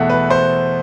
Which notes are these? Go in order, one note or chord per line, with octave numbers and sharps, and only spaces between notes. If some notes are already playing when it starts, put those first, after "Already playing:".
Already playing: E2 B2 A3 E5 F#5
B4
C5